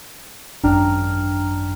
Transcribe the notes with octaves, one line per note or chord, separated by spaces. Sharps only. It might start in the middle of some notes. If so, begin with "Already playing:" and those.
G#1 F#2 D4 G5 A#5 F6